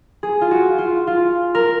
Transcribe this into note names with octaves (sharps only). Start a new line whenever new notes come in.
G#4
F4
F#4
F4
F4
A#4